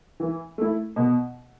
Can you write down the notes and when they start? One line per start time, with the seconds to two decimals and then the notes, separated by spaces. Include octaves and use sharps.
0.20 E3
0.58 A3 E4
0.96 B2